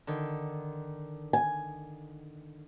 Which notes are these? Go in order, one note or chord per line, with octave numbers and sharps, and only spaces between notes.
D3 D#3
G#5